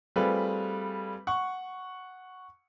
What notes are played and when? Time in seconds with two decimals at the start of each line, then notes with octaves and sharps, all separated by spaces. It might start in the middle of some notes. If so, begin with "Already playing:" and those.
0.16 G3 A3 C4 F4 G#4 B4
1.27 F#5 C#6